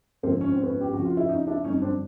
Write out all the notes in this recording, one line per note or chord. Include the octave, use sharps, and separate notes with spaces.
G#1 F#2 D3 F3 A#3 C4
C#4
C4
B3 C#4
G4
F2 C#3 F3 F#4
F4
E4
C#4 D#4
D4 E4
G1 F2 D3 F#3 C#4 D#4
C4 D4